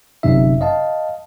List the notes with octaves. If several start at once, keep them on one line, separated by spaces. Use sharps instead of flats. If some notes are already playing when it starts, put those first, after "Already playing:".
G1 F#2 C3 D#4 E5
D#5 F5 A5